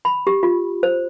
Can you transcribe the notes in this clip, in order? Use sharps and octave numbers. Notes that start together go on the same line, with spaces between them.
B5
G4
F4
C5